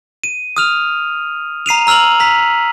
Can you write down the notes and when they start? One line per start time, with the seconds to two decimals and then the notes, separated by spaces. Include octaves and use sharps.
0.24 D#7
0.57 D#6 F6 F7
1.66 A#5 C7 D#7 F7
1.87 A#5 E6 F6 F7 F#7
2.20 A#5 B6